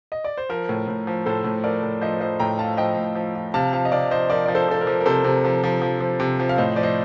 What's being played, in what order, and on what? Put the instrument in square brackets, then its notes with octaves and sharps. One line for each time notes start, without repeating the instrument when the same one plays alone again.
[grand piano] D#5
D5
C5
F3 A#4
A2
A2
F3
A2 A4 C5
A2
F3 A#4 D5
A2
F3 C5 D#5
F3 C5 D#5
A2 G5 A#5
F3 F5 A5
F3 D#5 G5
A2
F3
F3
C3 F5 A5
F3 F5 A5
D#5
C3 D5 F5
F3 C5 D#5
F3 A#4 D5
F3 D5
A4 C5
F3 A4
A#4
F3
A#4
C3 A4 C5
C3
F3
F3
F3
F3
C3
F3
F5
A2 C5 D#5
F3 D5
C5 D#5